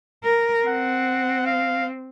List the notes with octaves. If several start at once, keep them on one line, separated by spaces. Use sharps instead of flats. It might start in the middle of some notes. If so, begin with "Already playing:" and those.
A#4
C4 F#5
F5